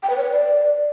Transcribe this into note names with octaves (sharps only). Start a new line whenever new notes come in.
G5
B4
C#5
B4
D5